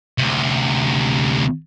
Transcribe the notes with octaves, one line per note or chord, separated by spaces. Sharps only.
D2 C3